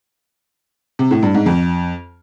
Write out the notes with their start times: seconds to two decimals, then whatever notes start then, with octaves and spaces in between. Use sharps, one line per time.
0.99 C3
1.11 A2
1.23 G2
1.34 G#2
1.46 F2